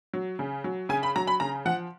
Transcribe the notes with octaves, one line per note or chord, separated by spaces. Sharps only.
F#3
C#3
F#3
C#3 G#5
B5
F#3 A#5
B5
C#3 A#5
F3 F#5